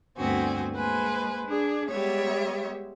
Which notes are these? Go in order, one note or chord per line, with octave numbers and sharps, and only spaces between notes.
D2 G2 B3 C4 F#4 G#5
G#3 A#3 B4 C5 G#5
D4 G#4
G3 G#3 B3 C#5 E5